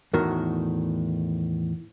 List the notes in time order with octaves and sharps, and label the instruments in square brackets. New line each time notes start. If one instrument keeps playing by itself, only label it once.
[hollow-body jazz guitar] E2 A2 D#3 F#4 A#4